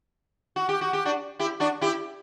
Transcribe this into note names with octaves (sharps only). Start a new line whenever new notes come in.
F#4
G4
F#4
G4
D4 F#4
E4 G4
D4 F#4
E4 G4